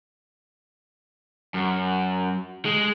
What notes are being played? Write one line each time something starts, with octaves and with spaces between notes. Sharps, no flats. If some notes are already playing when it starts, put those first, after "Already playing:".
F#2
G#3